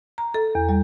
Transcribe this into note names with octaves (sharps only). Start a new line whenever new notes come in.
A#5
A4
E2
G3